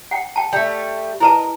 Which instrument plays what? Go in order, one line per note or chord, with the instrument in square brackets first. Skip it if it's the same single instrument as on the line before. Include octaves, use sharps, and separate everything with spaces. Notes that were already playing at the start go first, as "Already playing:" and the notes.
[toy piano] F#5 G5
G5 A5
[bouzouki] G3 A3 [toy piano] G5
[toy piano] E4 B4 A5 [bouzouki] A#4 D5 D#5